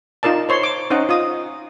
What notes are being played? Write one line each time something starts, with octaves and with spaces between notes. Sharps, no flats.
D#4 F4 A#4 D5 A5
C5 C#5 C6
D6
C#4 D#4 C5 D#5 F#5
F4 D#5 D#6